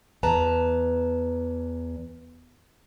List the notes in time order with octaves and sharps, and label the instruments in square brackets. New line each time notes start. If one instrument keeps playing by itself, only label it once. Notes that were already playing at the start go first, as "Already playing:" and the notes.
[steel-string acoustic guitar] E2 B4 A5 A#5